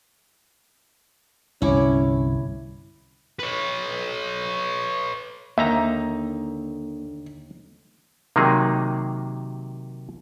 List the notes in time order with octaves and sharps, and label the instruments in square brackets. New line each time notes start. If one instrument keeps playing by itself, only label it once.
[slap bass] C2 G2 D3 [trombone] C#4 [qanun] E4 C#5 D6
[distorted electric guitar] B4 C#5
[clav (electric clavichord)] D#2 D#4 A#5 [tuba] D3 [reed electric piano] A#3 [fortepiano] E5
[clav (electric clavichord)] C3 D#3 F#3 A#3 D#4 G#4